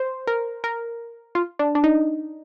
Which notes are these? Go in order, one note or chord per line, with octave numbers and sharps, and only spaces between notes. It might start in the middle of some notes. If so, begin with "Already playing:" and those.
Already playing: C5
A#4
A#4
F4
D4
D4
D#4